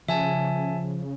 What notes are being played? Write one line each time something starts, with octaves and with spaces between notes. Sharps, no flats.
C#3 F3 E5 G#5 A5